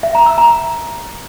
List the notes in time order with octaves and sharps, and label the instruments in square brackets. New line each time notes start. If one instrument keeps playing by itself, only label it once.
[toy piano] E5
A#5
E6
A#5